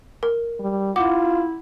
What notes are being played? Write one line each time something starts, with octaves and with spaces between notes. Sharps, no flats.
A#4
G3
E4 F4 F#5 D6